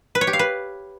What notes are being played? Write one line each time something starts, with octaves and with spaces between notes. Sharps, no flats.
B4
C#5
G4
F5
B4